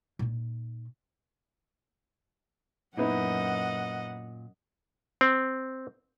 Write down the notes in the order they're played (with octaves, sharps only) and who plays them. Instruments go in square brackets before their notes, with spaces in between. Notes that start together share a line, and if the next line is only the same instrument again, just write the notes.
[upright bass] A#2 D#4
[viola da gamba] F#2 D#5 [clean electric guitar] A#2 [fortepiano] B3 D#4 E4 [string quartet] F#5
[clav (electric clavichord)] C4